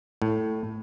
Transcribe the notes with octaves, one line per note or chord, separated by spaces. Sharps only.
A2